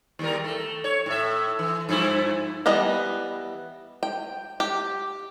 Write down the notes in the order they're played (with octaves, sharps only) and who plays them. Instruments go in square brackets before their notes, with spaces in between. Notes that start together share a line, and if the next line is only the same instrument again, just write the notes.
[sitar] D#2 G3 A#4
A3
C#5
A2 E5
E3
G2 F3 E4
[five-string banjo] E3 G3 B3 D#5
G5
G4